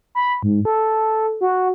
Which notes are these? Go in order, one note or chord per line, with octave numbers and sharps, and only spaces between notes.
B5
G#2
A4
F#4